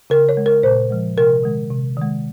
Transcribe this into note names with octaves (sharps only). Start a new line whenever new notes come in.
C#3 A#4
C#5
G#3
A#4
A#2 C5
F3 G#3
C3 A#4
D#3 G#3
C3
D#3 G#3